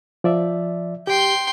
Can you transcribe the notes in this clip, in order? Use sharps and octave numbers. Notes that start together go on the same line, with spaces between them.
F3 D5 E5
G4 G5 C6